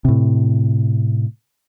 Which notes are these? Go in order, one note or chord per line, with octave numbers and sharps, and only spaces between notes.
A2 C3